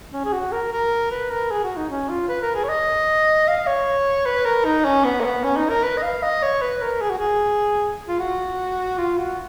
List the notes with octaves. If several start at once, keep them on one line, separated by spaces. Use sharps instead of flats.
C#4
G#4
F#4
A#4
A#4
B4
A#4
G#4
F#4
D#4
C#4
F4
B4
A#4
G#4
C#5
D#5
F5
C#5
B4
A#4
D#4
C#4
B3
A#3
B3
C#4
D#4
A#4
B4
D#5
F5
D#5
C#5
B4
A#4
G#4
F#4
G#4
F4
F#4
F4
F#4